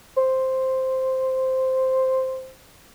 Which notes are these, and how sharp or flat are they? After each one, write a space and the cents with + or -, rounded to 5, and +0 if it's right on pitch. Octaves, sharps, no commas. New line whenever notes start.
C5 +0